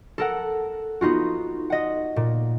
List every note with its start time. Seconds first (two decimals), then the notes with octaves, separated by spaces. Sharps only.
0.18 A4 A#4 F#5
1.01 B3 D#4 F4 F#4
1.70 D#5 F#5
2.16 A#2